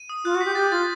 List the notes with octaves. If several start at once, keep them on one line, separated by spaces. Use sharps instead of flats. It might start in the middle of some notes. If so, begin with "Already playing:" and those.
Already playing: D#7
D#6
F4 F#6
F#4
G4 B6
G4 A6
F4 A6